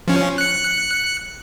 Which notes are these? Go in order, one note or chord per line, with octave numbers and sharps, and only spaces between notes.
F3 C#4
F#6 C#7